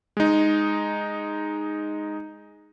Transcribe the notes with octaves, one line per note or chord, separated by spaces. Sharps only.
G#3 D#4